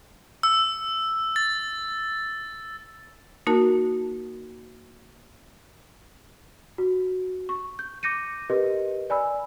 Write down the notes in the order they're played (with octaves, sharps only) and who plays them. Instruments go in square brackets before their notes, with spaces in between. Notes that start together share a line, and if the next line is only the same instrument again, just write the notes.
[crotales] E6
A6
[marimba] A#3 D#4 F#4 A#4 A5
[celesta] F#4
C#6
G6
D6 G6 A#6 C#7 D#7
G4 A#4 B4 D#5
D5 G#5 B5 E6